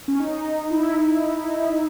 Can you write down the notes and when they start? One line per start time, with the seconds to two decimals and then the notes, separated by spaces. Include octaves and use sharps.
0.08 C#4
0.20 D#4
0.71 E4